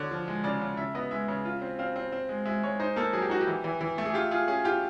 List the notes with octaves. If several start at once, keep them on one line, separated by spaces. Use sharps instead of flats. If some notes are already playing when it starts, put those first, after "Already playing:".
Already playing: D3 C#5
F3
G#3
C#3 D5
C#3
C#3 E5
B3 D#5
G#3 E5
C#3
F4
C4
C4 F5
C4
C4
G#3
G#3 E5
G#3 C#5
D#4 C5
A#3 A4
F#3 G#4
G4
D#4 F#4
G4
E3
E3
E3
A3
G#4
F4 G4
F4 G#4
C#4 G#4
F4 G4